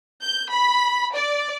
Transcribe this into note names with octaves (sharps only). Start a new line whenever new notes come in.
G6
B5
D5